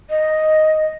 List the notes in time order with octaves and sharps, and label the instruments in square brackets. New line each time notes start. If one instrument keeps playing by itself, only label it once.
[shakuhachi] D#5